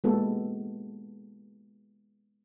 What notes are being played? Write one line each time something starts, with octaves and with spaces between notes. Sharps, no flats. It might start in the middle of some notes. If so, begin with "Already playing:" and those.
G#3 A#3 B3 F#4 G4 A4